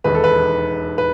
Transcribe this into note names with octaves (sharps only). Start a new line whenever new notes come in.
E1 D#2 D#3 B4
A4
B4
B4